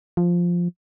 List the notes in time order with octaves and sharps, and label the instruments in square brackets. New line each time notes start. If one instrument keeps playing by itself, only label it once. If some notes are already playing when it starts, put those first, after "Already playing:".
[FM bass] F3